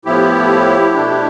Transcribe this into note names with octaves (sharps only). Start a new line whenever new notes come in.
A2 F3 B3 E4 G4
B2 A3 D4